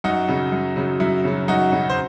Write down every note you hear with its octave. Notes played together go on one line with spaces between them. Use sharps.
F#2 D#4 F#4
C#3 F#3
F#2
C#3 F#3
F#2 E4
C#3 F#3
F#2 D#4 F#4
C#3 F#3
C5